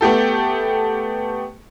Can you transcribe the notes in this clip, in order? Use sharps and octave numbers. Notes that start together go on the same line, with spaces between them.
A3 B3 G4 A4